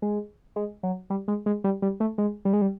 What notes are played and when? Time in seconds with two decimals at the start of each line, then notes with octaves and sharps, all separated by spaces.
0.02 G#3
0.56 G#3
0.83 F#3
1.10 G3
1.28 G#3
1.46 G#3
1.64 G3
1.82 G3
2.00 A3
2.18 G#3
2.45 G3
2.53 G#3
2.61 G3